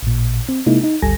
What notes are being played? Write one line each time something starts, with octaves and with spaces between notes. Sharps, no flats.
A1 A#2
C4
C3 G#3 A#3 D#4 E4
D#4
G#1 D2 G3 A4 G#5 A#6